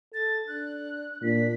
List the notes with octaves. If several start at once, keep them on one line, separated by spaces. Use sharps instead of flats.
A4 A6
D4 F#6
A#2 D4 B6